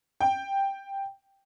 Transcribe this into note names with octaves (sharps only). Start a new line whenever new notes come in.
G5